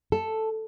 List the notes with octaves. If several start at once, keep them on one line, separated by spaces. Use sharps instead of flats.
A4